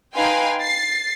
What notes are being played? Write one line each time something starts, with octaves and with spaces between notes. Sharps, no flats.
D#4 B4 F5 G5 G#5 C6
A6 C7